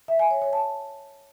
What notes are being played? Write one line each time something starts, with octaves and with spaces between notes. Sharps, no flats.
E5
G#5
C#5
C#5
A5